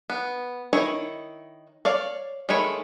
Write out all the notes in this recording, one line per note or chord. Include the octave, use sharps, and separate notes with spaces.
B3
D#3 D#4 E4 C#5
C#5 D5 F5
D#3 G#3 A3 C#5 B5